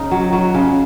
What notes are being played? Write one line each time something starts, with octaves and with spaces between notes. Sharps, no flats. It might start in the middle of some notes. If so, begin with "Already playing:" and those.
Already playing: C#3 D#4
F#3
F#3
C#3